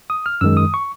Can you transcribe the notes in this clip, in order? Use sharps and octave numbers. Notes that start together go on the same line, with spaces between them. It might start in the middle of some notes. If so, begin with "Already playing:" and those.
D#6
F6
F#2 D#3 G#3 E6
D#6
C#6